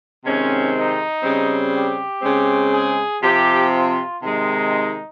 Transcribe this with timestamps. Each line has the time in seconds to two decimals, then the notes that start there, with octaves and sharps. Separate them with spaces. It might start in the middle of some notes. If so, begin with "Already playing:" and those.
0.24 C3 D#3 G#3 C4 C#4
0.74 D#4
1.23 C#3 G3 C4
1.73 G4
2.22 C#3 G#3 C4
2.72 G#4
3.21 C3 F3 C4 G4
3.72 F4
4.21 C3 D#3 G#3 D#4